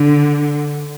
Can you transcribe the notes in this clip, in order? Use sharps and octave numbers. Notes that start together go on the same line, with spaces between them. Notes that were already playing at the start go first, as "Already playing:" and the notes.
Already playing: D3